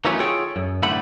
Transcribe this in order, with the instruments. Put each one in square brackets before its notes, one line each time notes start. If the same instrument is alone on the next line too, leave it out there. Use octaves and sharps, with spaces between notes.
[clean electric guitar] D#3 E3 F#3 A3 B3 C#4
F4 G#4 A4 C#5 G5
F#2
C2 A2 D3 A3 F#5 B5